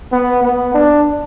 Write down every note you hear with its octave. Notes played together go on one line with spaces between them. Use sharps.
B3
B3
D4